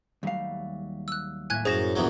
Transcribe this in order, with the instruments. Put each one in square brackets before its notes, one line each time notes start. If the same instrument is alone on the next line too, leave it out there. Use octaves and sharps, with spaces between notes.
[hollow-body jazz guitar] D#2 F5 [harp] F#3 G3 A3
[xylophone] E6 F#6
[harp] A2 A#3 E5 [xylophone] G#5 F#6 G#6
[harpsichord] F#2 [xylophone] G#4 A#6 E7 [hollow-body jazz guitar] C5 C#5
[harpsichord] A#1 E2 F#3